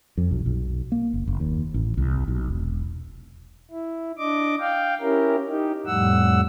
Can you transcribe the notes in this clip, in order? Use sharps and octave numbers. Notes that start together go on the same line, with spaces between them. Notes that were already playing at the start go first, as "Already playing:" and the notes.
F2
B1
B1
A#3
F#1
F#1
D#2
A1
C2
B1
E1
E4
D4 D#5 D6
F5 G5
C#4 E4 G4 A#4
D#4 G4
F2 A2 G3 F#5 E6